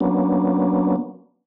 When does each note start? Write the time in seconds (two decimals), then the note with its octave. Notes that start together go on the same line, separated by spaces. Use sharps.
0.01 F#3 A#3 B3 C#4 D4